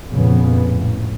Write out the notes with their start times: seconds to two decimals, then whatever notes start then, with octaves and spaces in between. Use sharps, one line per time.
0.13 F2 A#2 C#3 B3
0.62 A2